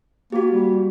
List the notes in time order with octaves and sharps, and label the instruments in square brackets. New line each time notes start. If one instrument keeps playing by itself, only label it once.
[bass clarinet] A#3 [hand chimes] F#4 G4
[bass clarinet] G3